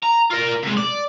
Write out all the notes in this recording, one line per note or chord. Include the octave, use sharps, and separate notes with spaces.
A#5
F4 A#4
C3 G#3
D5